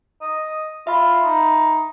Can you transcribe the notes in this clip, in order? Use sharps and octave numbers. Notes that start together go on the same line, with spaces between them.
D#5
F4 E5 B5
D#4